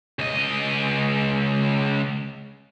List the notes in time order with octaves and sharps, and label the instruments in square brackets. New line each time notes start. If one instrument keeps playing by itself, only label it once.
[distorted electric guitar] C#2 D#5